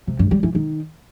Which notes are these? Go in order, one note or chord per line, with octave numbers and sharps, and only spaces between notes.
C3
G2
G3
E3
D#3